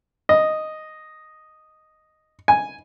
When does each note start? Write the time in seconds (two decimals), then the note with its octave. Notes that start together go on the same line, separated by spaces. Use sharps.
0.29 D#5
2.48 G#5